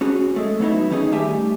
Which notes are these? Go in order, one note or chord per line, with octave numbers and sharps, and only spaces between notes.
C#4 F#4 G#4
G#3 A3
F#3 B3 D#4 E4
D#3 C#4 D#4 G#4
G3 A3 G4 E5 G#5